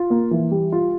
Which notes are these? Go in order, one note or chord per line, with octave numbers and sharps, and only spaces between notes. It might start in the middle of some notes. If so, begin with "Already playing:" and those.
Already playing: F4
A#3
E3
G3
F4